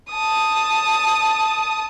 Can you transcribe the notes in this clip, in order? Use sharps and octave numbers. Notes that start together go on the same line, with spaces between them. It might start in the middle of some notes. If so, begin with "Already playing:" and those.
A5 D#6